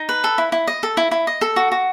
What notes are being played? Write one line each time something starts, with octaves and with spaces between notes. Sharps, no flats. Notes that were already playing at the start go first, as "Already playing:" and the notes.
Already playing: D#4
B4
A4
E4
E4
D#5
A4
E4
E4
D#5
A4
F#4
F#4